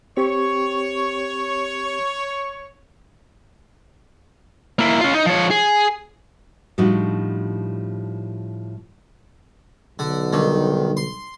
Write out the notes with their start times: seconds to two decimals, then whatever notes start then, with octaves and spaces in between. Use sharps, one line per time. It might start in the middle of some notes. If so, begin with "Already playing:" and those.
0.17 C4 G4 C#5
4.79 A#3 E4
5.01 C#4 F4
5.15 D#4
5.26 F3 C#5
5.50 G#4
6.78 A2 F3 G3 D4 D#4 F#4
9.99 B1 D3
10.33 D3 D#3 G3
10.97 C6